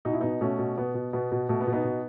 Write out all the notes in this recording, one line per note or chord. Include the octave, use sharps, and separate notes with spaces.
B2 D#4
E4
B2 B3 D#4
B2 A3 C#4
B2
B2 B3
B2
B2 B3
B2
B2 A3
B3
B2
B3 D#4
B2